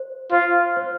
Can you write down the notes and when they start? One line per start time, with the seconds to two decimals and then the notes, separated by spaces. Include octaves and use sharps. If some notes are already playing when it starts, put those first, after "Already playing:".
Already playing: C5
0.31 F4 C5
0.76 C5